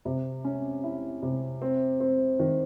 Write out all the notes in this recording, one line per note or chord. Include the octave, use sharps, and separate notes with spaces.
C3
C#4
E4
C3
C4
C4
D#3